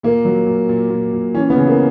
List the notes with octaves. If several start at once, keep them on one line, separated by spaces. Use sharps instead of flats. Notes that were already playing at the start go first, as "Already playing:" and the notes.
A#2 A#3
F#3
A#2
A#2
A#2
A#2
E3 C#4
B3
C#3
A#3